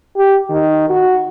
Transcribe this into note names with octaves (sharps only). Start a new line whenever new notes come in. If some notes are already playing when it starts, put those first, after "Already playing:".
G4
D#3
F#4